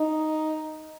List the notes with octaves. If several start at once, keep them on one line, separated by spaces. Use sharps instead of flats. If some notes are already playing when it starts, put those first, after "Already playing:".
Already playing: D#4